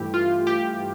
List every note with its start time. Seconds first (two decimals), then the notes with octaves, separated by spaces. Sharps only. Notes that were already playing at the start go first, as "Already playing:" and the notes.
Already playing: G2 E3 A3 G4
0.14 F4
0.47 G4